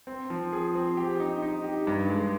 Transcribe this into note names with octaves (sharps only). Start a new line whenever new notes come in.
C4
F3
G#4
C4
G4
D#4
D#4
G4
G2
G#3